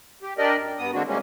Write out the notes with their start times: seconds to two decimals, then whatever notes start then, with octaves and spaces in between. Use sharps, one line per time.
0.22 G4
0.38 D4 G4 A#4 D5 D#5
0.57 F#2
0.79 G2 B3 D#6
0.93 D3 G#3 A#3 C4 D4 F#4
1.07 C3 G3 G#3 A#3 C#4